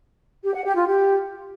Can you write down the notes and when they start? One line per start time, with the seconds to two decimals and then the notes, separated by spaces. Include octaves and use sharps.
0.44 G4
0.55 F#5
0.65 G4
0.76 F4
0.87 G4